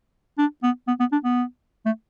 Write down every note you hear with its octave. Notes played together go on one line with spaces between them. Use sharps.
D4
B3
B3
B3
D4
B3
A3